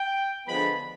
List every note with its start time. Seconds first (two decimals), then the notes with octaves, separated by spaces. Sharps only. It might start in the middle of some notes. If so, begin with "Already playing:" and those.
Already playing: G5
0.46 D3 F3 G#3 B3 B5